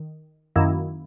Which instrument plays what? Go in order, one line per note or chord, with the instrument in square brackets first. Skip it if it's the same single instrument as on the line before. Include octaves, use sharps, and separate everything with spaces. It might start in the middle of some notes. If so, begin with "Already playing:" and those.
Already playing: [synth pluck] D#3
F#2 D#3 A#3 E4